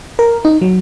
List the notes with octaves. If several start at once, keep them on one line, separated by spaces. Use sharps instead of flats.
A#4
D#4
F#3